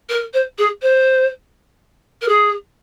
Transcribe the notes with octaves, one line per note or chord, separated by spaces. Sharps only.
A#4
C5
G#4
C5
A#4
G#4